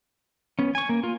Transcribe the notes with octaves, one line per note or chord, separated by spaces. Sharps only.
B3 C#4
G#5 C#6
A#3
F4